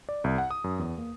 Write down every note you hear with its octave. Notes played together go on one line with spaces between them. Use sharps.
D5
C2
F#5
D#6
F#2
E2
A#3